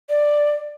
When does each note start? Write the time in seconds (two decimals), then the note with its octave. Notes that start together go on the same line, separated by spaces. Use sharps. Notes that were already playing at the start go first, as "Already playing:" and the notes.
0.10 D5